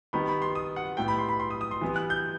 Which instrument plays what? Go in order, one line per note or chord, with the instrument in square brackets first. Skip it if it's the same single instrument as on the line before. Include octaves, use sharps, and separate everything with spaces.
[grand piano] D#3 G3 B3 B5
B5
C6
D#6
F#5
A2 G3 B3 G5
B5
C6
B5
C6
D#6
D#6
C6
E3 G3 B3
F#6
G6